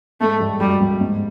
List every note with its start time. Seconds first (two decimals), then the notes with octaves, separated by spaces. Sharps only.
0.21 G#2 G#3 A3
0.40 G2 G3
0.60 F#2 F#3 G3
0.80 G2 G3
1.01 G#2 G#3